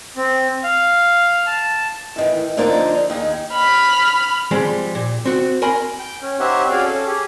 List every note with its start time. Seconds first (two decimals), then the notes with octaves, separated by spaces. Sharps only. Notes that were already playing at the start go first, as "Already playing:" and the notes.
0.17 C4
0.64 F5
1.46 A5
2.16 A2 D#3 E3
2.57 D3 F3 A#3 D4 D#4
3.10 D#2 D#4 G#4
3.53 B5 F6
4.51 F3 G3 G#3 C4
4.95 A#2
5.25 C4 F#4
5.62 A#4 G#5 B5 C6
5.99 G5
6.22 C#4
6.40 C4 D#4 G4 C#5 E5 F#5
6.70 C#4 F#4 G#4 D5 F5
6.84 C#4 A4
7.07 G4 G#4